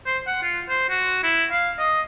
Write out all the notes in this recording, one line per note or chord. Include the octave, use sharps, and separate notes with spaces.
C5
F#5
F4
C5
F#4
E4
F5
D#5